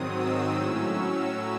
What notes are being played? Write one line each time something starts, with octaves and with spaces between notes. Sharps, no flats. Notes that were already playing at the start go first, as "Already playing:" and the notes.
Already playing: G#2 D#3 F#3 C4 D#6
E6
A2 F#3 C#4